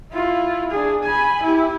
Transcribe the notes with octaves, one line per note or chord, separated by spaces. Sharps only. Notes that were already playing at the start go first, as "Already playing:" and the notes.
E4 F4
D4 G#4
G#5 B5
E4 G4